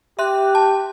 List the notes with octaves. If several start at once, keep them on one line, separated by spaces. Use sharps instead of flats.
G4 E5 C6 F#6
A5